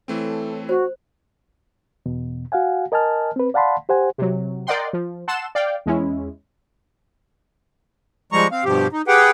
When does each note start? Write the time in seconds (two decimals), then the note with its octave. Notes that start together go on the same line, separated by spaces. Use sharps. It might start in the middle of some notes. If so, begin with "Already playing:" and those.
0.08 E3 A3 C4 E4 A4 C#5
0.69 F#4 C5
2.06 E2 B2
2.52 F#4 F5 F#5 G#5
2.92 A#4 D#5 G#5 A5 F6
3.36 C4 B4
3.54 D5 F5 F#5 A5 B5 C6
3.89 G4 C5 F#5 G#5
4.18 C3 F#3
4.67 A#4 D5 D#5 F#5 G5 C6
4.93 F3
5.28 F#5 A5 C6 E6 E7
5.55 D5 F5 G5
5.86 E2 G#3 C#4 E4
8.32 F3 G3 G#3 A#5 C#6
8.52 C4 F5
8.65 G2 B2 F3 G4
8.93 D#4
9.08 G4 G#4 B4 F#5 G5